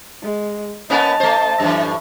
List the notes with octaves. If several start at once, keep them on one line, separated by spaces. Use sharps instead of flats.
G#3
A#3 B3 C#4 D#5 A5
A3 C5
F#2 A2 E3